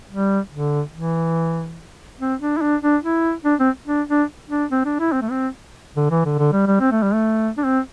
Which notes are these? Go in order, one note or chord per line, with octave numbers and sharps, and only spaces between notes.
G3
D3
E3
C4
D4
E4
D4
D4
E4
D4
C4
D4
D4
D4
C4
D4
E4
C4
A3
C4
D3
E3
D3
D3
G3
G3
C4
A3
G3
A3
D4
C4